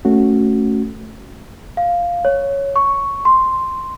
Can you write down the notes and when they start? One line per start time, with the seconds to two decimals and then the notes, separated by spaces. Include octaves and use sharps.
0.05 A3 C#4 F#4
1.77 F5
2.25 C#5
2.76 C#6
3.25 C6